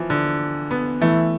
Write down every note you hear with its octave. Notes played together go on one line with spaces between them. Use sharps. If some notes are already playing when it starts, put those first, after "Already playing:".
Already playing: E3 F3
D3
B3
E3 A3